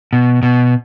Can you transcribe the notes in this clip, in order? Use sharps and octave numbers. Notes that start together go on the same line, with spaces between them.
B2
B2